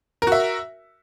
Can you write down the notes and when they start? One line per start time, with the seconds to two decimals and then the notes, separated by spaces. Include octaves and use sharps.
0.22 A#4
0.27 F#4
0.32 E5